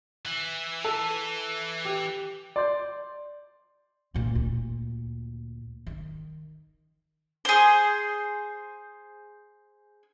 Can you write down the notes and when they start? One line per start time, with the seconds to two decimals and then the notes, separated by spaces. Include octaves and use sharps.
0.26 E3
0.85 A4
1.85 G4
2.56 D5 C6 G6
4.14 D#2 A#2
4.35 D2 A#2
5.87 D#3
7.45 G#4 C5